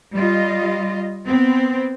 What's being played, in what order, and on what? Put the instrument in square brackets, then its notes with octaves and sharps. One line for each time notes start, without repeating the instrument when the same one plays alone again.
[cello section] G3 F4 D#5
B3 C4